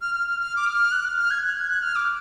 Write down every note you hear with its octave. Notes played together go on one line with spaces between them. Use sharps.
F6
F6
F6
F6
D6
F6
F#6
F6
F6
G#6
F#6
G#6
F#6
F6
D6